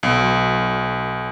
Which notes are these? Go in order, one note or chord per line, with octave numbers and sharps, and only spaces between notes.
B1